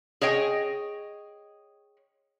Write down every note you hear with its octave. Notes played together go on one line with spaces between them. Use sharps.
G#4 C#5 D#5 G5